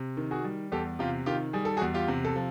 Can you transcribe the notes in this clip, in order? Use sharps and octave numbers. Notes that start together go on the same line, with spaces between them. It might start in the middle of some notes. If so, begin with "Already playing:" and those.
Already playing: C3
D#3
F#4 G#4
G3
E2 G4 A4
C3 F4 G4
D#3 F4 G4
G3 G#4
A4
F#4 G#4
E2
F4 G4
C3
A4
F3